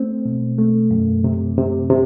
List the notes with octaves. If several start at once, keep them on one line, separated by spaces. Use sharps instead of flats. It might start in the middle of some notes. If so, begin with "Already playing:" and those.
Already playing: A3 C4
B2
A3
F#2
C3
C3
C3